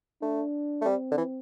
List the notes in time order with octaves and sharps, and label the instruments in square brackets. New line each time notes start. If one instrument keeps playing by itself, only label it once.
[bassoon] A3 [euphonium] D4
[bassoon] A3
[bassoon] G3 [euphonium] C4
[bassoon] D3
E3